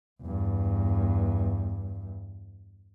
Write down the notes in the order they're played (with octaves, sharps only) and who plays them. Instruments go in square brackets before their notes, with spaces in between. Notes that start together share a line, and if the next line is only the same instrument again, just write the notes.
[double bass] E2 G2